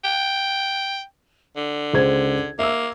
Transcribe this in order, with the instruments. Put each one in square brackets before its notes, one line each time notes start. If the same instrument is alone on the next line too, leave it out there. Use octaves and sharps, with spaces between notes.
[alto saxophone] G5
D3
[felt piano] C#2 C5 G#6
[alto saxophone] A#3 [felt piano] E5 E6